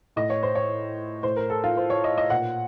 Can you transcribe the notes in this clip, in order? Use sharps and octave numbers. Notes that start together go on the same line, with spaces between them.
A2 D#5
C#5
C5
C#5
A2 C5
A#4
A4
F4
C5
C#5
D#5
D#5
A#2 F#5